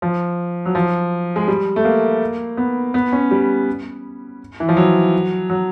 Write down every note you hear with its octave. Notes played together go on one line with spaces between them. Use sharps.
F3
F#3
F3
G#3
G3
A3
A#3
B3
B3
C#4
G3
E3
F3
F#3
F#3